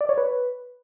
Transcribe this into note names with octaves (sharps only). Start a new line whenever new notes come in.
D5
C#5
B4